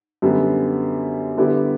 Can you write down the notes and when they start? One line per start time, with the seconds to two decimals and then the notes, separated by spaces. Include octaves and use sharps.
0.22 F#2 D3 G3 B3
1.37 D3 G3 B3 E4 G4